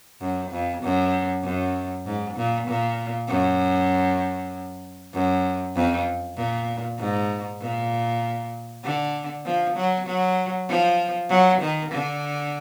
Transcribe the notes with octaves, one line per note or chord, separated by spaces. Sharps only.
F#2
F2
F#2
F#2
G#2
A#2
A#2
F#2
F#2
F2
A#2
G#2
A#2
D3
F3
F#3
F#3
F3
F#3
D#3
D3